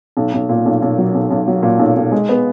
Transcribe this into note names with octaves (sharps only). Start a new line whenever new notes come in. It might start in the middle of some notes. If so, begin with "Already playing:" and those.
B1
B1
A#2
B1
B1
F#3
B1
B1
F#3
A#2
B1
B1
G#3
B3